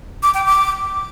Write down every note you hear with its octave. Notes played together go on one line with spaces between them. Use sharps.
D6
G5
D6